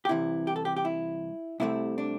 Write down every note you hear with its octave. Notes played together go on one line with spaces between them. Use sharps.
G4
C2 C3 E3 E4
G4
A4
G4
G4
E4
C2 C3 A3 C4 E4
D4